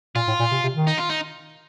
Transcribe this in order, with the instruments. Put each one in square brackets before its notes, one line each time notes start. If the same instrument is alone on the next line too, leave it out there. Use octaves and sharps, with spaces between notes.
[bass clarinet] A#2 [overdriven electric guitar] F4
[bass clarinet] A2
A#2
C3
C3
D#3
[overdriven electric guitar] D#4
F4
D#4